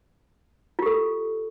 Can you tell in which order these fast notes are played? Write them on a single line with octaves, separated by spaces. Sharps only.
F4 G4 A4